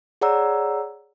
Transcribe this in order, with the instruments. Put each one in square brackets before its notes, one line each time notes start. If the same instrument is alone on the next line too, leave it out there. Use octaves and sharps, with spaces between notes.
[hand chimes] G#4 C#5 D5 F#5 A#5 E6